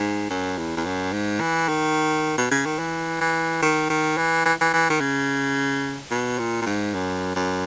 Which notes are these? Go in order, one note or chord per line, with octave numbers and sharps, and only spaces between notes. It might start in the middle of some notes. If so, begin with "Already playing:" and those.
Already playing: G#2
F#2
E2
E2
F#2
G#2
E3
D#3
B2
C#3
D#3
E3
E3
D#3
D#3
E3
E3
E3
E3
D#3
C#3
B2
A#2
A#2
G#2
F#2
F#2